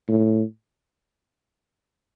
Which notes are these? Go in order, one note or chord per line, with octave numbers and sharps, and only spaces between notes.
A2